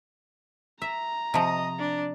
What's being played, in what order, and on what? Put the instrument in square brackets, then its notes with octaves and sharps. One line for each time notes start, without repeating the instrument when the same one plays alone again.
[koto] E5 [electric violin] A#5
[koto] C3 F3 [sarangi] D#5
[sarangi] D4